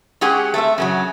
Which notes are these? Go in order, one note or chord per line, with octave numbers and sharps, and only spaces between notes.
G#3 C#4 G4 G#4 F#5
A3 C4 E5
F#2 C#3 F#3